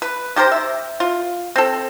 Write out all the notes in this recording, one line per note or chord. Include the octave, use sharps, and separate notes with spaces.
B4
D#3 G4 A#4 C5
E5
F4
C4 A4